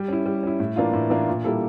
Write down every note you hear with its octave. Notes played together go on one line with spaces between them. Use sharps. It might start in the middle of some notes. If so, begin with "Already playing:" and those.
Already playing: G3
C#4 E4
G3
C#4 E4
A2
E3 A#3 D4 F4
A2
E3 A#3 D4 F4
A#2
G3 A#3 E4 A4